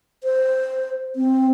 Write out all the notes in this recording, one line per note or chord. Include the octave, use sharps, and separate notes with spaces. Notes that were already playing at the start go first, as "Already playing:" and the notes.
C5
C4